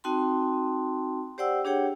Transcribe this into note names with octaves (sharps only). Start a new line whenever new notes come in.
C4 D#4 F#4 G5 A5 C6
G4 C5 D5 F#5 G5 E6
D4 G4 G#4 C#5 F#5 G5